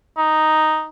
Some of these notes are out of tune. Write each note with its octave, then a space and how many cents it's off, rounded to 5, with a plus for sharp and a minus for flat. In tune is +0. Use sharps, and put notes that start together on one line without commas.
D#4 +0